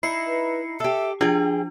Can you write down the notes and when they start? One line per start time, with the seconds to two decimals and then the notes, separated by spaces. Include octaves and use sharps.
0.03 D#4 E4 C7 C#7
0.27 B4
0.80 G4 A4 E5
1.21 F3 D4 F4 G#4 G5